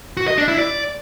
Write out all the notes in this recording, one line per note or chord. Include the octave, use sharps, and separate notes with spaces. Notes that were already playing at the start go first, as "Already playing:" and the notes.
F#4
D#5
D4
E4
D5